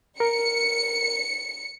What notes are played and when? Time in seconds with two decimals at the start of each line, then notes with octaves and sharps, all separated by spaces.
0.20 A#4 C#7